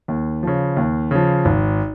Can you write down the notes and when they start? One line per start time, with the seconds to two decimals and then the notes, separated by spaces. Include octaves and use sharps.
0.08 D#2
0.43 C#3 F3
0.77 D#2
1.11 C#3 F3
1.45 G#1